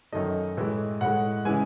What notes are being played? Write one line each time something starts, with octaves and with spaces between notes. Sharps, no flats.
F#2 D#3 A3 D#5
A2 E3 G#3
A2 F#5
G#3
C#3 E3 G#3 G#5